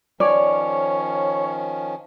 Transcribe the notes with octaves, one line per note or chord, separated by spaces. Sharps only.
D#3 F3 C#4 C#5 D5